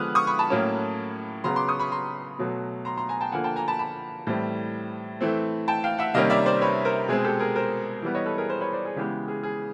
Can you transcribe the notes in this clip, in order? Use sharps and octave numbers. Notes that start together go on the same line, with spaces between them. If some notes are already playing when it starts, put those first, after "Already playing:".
Already playing: D3 F3 G#3 B3 D#6 F6 F#6
C#6 D#6
B5 C#6
A5 B5
A2 F#3 A#3 C#4
C#3 F#3 B3 A#5 C6
C6 D6
C#6 D#6
B5 C#6
A#5 C6
B2 F#3 A3
A#5 C6
A#5 C6
G#5 A#5
G5 A5
D3 F3 A#3 F#5 G#5
G5 A5
G#5 A#5
A5 B5
A5 B5
A2 E3 G3 C4
E3 A3 C4
G5 A5
F5 G5
E5 F#5
C3 D#3 G3 A#3 C#4 D#5 F5
D5 E5
C5 D5
B4 C#5
A#4 C5
B2 G#3 C4 G#4
G4 A4
G#4 A#4
A#4 C5
E3 G3 B3
C#5 D#5
A4 B4
G#4 A#4
A#4 C5
B4 C#5
C5 D5
G#4
C#3 E3 G#3 B3 G4
G#4
G#4